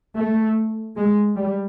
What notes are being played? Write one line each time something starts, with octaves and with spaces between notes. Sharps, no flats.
A3
G#3
G3